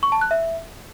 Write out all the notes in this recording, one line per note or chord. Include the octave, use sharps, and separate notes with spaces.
C#6
A5
F#6
E5